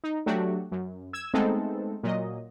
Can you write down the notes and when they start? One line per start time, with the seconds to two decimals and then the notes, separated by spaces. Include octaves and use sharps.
0.04 D#4
0.26 F#3 A3 D4 F#4 G4
0.72 F#2
1.13 E6 G#6 E7
1.34 G#3 A3 B3 C4 D#4 A4
2.03 A#2 F#3 D#5